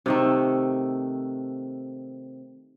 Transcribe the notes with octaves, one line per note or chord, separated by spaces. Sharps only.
C3 D#3 A3